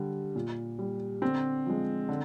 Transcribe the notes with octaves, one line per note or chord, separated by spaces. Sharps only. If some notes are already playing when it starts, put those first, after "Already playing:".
Already playing: D3 G3
A#2
G3
D3 C4
F3 G#3
D3